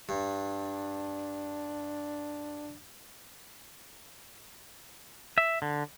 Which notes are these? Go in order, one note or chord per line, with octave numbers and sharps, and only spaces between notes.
G2 D4
E5
D3